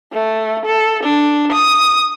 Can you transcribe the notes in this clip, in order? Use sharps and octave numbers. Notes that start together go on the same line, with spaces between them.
A3
A4
D4
D#6